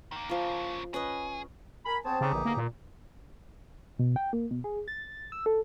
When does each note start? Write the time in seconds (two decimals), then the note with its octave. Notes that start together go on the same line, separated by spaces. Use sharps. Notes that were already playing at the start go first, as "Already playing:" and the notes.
0.12 D#3 A#3
0.29 C#3 F3 A#3 F4
0.94 C#4 G#4 B4 D#5
1.86 A#4 G#5 B5
2.05 B3 C4 G#4 C#5 A5
2.21 C#3 D#4 G4 G#4
2.33 A#1 E2 D3
2.45 A#3
2.57 A#2
3.99 B2
4.16 G5
4.33 A#3
4.51 B2
4.64 G#4
4.88 A6
5.32 E6
5.46 A4